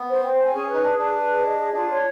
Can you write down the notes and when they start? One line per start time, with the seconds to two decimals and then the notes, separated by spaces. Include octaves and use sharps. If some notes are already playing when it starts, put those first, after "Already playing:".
Already playing: B3
0.09 C5
0.23 C4 C5
0.39 G#5
0.45 C4
0.53 C#4 G#4
0.69 D#4 B4
0.83 D4 G#4
0.98 D4 B4
1.14 B4
1.29 G#4
1.44 D#5
1.59 G#4
1.74 D4 F4
1.89 C#5